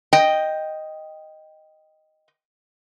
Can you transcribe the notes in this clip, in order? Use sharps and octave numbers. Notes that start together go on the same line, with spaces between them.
D#5 G5